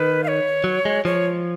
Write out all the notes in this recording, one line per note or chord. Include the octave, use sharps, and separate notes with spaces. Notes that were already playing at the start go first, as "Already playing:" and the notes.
Already playing: D#3 B4
F5
C#5
F#3
G#3
F3 C#5